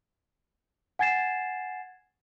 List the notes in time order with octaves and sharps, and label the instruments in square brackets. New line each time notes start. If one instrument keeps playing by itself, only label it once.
[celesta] F#5 G#5 G#6 A6 C7 E7